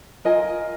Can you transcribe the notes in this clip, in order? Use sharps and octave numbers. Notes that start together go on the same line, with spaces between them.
F4 A#4 D#5 G#5